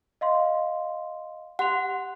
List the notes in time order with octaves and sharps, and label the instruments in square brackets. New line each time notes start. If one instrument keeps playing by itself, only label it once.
[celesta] D#5 F5 C6
[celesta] G4 C6 F7 [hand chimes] F#5